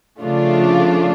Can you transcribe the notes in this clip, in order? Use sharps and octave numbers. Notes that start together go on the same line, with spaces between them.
C#3 F3 A3 D4 F4